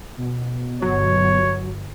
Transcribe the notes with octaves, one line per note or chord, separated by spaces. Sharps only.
B2
G1 F#3 C#5